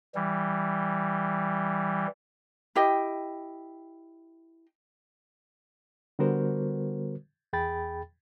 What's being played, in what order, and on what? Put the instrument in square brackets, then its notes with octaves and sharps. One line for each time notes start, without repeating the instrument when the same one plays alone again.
[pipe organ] E3 G3
[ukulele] E4 G4 D#5 G5
[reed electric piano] D3 G3 B3 F#4 A#4 C5
E2 G#4 G5 B5 A6